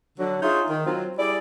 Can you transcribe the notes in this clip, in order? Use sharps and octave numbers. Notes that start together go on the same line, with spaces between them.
D3 F#3
D4 D#4 F4 G#4 C#5 E5
D#3
F#3 C4 F4
G3 E4 G#4 D5